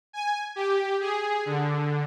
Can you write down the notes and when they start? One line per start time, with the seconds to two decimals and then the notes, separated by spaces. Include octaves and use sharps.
0.13 G#5
0.56 G4
1.00 G#4
1.46 D3